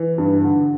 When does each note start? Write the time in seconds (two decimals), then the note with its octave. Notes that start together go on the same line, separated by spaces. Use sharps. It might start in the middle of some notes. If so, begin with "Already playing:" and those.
Already playing: E3
0.18 G2
0.44 D3